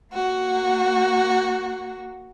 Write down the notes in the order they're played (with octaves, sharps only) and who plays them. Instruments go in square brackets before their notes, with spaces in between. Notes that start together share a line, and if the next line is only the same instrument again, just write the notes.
[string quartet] A#3 F#4